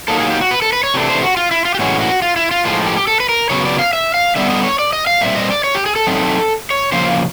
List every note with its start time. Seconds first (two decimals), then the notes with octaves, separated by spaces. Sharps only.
0.08 F#3 A#3 D#4 A4
0.19 G#4
0.30 G4
0.41 F#4
0.51 B4
0.62 A4
0.73 B4
0.84 C#5
0.94 C3 E3 A3 D4
1.09 C5
1.22 F#4
1.37 F4
1.51 E4
1.65 F4
1.75 G4
1.79 A2 E3 G#3 C#4 F#4
2.00 F#4
2.22 F4
2.36 E4
2.51 F4
2.65 A2 F3 G#3 F4
2.87 G4
2.97 G4
3.07 A4
3.20 B4
3.29 A#4
3.50 C#3 F#3 B3 C#5
3.65 D5
3.79 F5
3.93 E5
4.14 F5
4.36 D3 G3 B3 E5
4.50 D#5
4.64 C#5
4.79 D5
4.93 D#5
5.07 F5
5.21 A#2 G3 C4 E5
5.35 D#5
5.50 D5
5.64 C#5
5.75 G4
5.86 G#4
5.96 A4
6.07 F#3 A3 C4 D#4
6.70 C#5
6.92 C#3 F3 A#3 C5